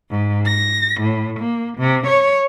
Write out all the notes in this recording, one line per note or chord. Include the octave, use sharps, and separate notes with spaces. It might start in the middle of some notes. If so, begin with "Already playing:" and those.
G#2
A#6
A2
A#3
C3
C#5